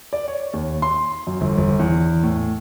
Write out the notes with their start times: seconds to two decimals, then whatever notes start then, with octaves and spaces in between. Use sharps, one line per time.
0.13 D5
0.28 C#5
0.53 D#2
0.82 C6
1.27 F#2
1.41 G1
1.58 G1
1.79 E2
2.23 A2